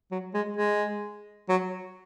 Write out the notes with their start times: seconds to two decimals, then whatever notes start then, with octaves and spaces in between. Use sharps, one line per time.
0.11 F#3
0.34 G#3
0.57 G#3
1.49 F#3